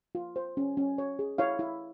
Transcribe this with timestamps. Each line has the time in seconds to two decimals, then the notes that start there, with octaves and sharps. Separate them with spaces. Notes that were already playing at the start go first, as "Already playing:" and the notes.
0.15 F4
0.36 C5
0.57 C#4
0.77 C#4
0.98 C#5
1.19 G#4
1.38 E4 C#5 F5
1.59 E4